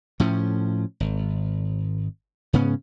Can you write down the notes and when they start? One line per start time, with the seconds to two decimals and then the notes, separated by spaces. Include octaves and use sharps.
0.20 A2 F3 C#4
1.00 G#1
2.53 G#2 C#3 B3 C#4